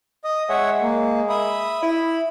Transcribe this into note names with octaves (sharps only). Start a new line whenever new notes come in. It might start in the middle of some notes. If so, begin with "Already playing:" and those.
D#5 D#6
G#3 C#5 E5 F#5
A#3
E5 B5 D#6
E4 B5